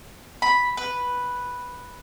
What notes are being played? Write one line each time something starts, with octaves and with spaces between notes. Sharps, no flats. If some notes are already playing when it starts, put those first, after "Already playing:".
B5
B4